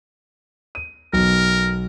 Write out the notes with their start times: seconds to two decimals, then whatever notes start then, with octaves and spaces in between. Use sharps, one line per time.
0.75 D#7
1.13 B1 A#4